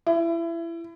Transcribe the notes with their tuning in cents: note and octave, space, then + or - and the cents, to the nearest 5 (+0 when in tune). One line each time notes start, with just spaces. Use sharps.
E4 +25